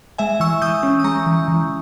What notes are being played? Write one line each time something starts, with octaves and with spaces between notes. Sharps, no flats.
G#3 E5 G#5
E3 C#6 E6
E3 D#6 G6
C#4
D#6
G#3 A#5 C#6
E3
E3